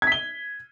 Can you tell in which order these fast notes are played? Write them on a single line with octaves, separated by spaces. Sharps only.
G#6 B6 G7